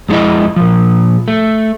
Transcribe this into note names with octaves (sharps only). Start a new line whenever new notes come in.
F2 G#3 D4 E4 D#5
A#2 F3
A3